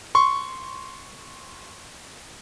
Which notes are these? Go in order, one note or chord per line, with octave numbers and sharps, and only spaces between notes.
C6 C#6